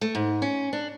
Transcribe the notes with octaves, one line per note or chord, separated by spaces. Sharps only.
A3
G#2
C#4
D4